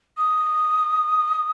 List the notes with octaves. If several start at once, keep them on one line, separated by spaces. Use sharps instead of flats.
D#6